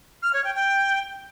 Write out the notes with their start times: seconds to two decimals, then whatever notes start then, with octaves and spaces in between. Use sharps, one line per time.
0.22 F6
0.33 C#5
0.44 G5
0.55 G5